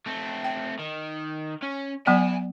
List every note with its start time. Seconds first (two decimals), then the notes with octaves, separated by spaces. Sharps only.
0.06 A3 C4
0.44 G5
0.79 D#3
1.63 C#4
2.07 F#3 B3 D5 G#5 B5